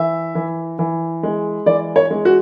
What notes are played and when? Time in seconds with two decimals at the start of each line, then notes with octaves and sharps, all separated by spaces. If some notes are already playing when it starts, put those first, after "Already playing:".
Already playing: E3 E5
0.35 E3
0.79 E3
1.23 G#3
1.66 E3 D5
1.96 C#5
2.11 G#3
2.25 F#4